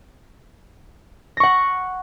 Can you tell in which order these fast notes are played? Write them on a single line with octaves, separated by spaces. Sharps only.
A#6 C#6 F#5